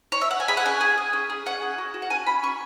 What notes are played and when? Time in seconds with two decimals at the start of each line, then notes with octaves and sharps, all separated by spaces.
0.12 C#5
0.21 E5
0.31 F#5
0.40 G#5
0.48 G#4 B5
0.57 F#5
0.65 C#4 G#5
0.81 G#4
0.98 G#4
1.13 C#4
1.30 G#4
1.46 C#4 F#5
1.62 G#4
1.78 F#4
1.94 F#4
2.02 F#5
2.10 C#4 G#5
2.27 C#4 B5
2.43 C#4 C#6